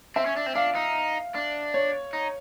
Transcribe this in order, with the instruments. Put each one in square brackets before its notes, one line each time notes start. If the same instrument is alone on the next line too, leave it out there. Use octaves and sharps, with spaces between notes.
[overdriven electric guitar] C4 [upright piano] E5
[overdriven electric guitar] C#4
D4
C4
[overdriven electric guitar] D4 [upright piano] F5
[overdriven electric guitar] D#4
D4
[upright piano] C#5
[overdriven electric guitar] D#4